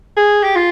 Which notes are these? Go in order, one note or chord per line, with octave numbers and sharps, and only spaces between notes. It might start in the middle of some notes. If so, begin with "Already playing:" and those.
G#4
G4
F4